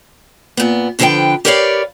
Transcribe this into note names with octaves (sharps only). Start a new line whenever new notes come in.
A#2 B3
F2 D3 F3 A4 B4 G5
G4 A#4 B4 C#5 D5 F5